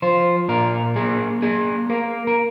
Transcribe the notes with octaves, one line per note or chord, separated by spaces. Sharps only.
F3 C5
A#2 A#4
A#3 G#4
A#3 G#4
A#3 A#4
A#4